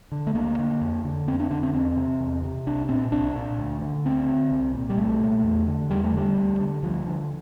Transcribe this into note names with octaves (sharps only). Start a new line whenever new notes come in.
D3
A3
D2 A#3
D3
F2
D3
F2 C4
D4
D3 D4
C4
E2 C4
C3
E2
C3
C2 D4
A#2 C4
C2 D4
A#2
D2
D3
D2 C4
D3
C2
A#2
G3
C2 A3
A#2
E2
D3
E2 G3
A3
D3 G3
D2
D3
D2 F3
D3